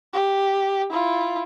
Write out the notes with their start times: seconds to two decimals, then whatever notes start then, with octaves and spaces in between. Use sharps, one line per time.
0.13 G4
0.90 E4 F4